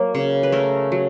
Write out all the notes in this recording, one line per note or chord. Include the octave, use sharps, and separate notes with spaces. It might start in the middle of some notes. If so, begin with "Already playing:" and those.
Already playing: F#3 A#3
C#3
B4
A3 A#4
F#3